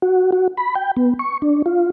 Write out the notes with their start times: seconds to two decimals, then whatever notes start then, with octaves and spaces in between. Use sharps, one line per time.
0.02 F#4
0.32 F#4
0.57 B5
0.75 G5
0.97 B3
1.19 C#6
1.42 D4
1.66 F4